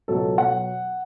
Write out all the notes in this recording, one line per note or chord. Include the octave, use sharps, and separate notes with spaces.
C#2 B2 F#3 A4
B2 F#3 F#5